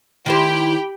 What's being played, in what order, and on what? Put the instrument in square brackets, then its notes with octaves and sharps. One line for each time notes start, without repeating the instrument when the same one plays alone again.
[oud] D#3 E4 C5 [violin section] G4 G5 B5